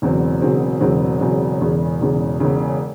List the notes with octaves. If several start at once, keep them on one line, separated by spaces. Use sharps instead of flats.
E1 E2 C#3 F#3 C4
E1 E2 C#3 F#3 C4
E1 E2 C#3 F#3 C4
E1 E2 C#3 F#3 C4
E1 E2 C#3
E1 E2 C#3
E1 E2 C#3